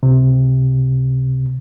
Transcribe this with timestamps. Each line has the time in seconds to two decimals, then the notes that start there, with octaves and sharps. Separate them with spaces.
0.03 C#2 C3